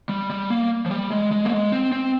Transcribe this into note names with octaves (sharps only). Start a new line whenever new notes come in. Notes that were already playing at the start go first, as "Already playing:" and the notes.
G3
G3
A#3
F3
G3
G#3
G#3
A#3
G#3
C4
C4